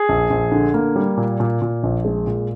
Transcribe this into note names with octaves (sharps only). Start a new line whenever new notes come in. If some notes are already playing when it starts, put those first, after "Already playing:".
Already playing: G#4
A#1
A#1
D3
A#3
G3
A#2
A#2
A#2
A#1
G#3
A#2